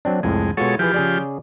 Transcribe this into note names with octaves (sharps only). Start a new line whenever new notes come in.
F#3 C4 D4
C2 F2 A2 G#3
B2 G#3 F4 F#4 A4 C#5
E3 F3 G4 G#4 B4
C#3 G#4 D5